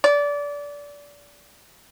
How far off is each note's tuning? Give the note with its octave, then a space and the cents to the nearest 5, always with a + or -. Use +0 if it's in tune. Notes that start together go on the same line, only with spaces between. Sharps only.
D5 -25